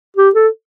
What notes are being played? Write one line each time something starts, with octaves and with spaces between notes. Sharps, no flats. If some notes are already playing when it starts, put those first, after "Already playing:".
G4
A4